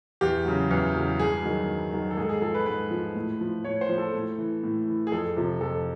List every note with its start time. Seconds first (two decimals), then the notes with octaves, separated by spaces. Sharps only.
0.21 E2 G4
0.45 C#3 F#3
0.71 E2
0.95 C#3 F#3
1.19 G2 G#4
1.44 D#3 F#3
1.68 G2
1.93 D#3 F#3
2.11 A4
2.17 G#2 G#4
2.25 A4
2.29 G#4
2.42 F3 A4
2.54 B4
2.66 G#2 B4
2.91 F3
3.15 A2
3.41 F3
3.64 A2 C#5
3.81 C5
3.89 F3
3.98 A4
4.14 A2
4.38 E3
4.63 A2
4.88 E3
5.07 G#4
5.12 F2 A4
5.37 C3 F3
5.61 F2 A4